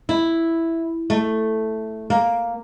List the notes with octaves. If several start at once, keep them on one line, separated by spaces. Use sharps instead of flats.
E4
A3
A#3